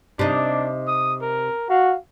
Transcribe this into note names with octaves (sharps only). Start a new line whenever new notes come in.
C3 D4 D#4
D#6
A#4
F#4 F5